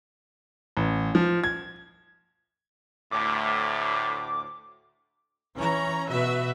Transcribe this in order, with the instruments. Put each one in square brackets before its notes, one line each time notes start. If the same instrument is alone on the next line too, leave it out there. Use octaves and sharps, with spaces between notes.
[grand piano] A1
F3
G#6
[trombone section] D2 A2 [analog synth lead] D6
[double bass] E3 [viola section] C#4 C#5 A#5
[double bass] B2 [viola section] F#4 B4 E5